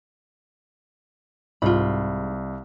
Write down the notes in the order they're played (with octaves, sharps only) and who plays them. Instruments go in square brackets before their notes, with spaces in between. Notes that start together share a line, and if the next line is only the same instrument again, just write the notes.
[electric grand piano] C2 [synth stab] G#2 [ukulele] F4 B5